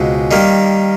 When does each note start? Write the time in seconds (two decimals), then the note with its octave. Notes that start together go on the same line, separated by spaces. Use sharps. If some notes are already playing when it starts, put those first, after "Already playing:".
Already playing: C#2 B2 G#3 C4
0.31 D#3 G3 A#3